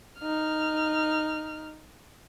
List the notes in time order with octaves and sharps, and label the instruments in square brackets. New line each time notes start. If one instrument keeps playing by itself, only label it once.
[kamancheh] D#4 F6